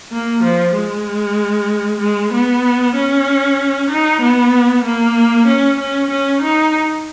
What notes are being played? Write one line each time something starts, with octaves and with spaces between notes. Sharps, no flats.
A#3
F3
G#3
G#3
B3
C#4
D#4
B3
A#3
C#4
C#4
C#4
D#4